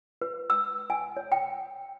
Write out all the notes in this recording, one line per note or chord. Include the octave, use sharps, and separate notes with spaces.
B4
E6
G#5
C#5
G5